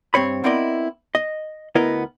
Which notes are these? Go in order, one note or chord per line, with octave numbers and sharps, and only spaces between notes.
G2 C4 C#5 B5
B3 C4 E4 A#4 D5 D#5
D#5
D2 B3 E4 A#4 D#5